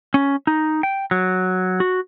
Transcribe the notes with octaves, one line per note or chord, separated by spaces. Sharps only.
C#4
D#4
G5
F#3
F#4